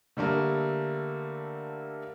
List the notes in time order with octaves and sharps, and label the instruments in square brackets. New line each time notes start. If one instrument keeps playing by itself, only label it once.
[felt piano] D3 G3 A3 A#3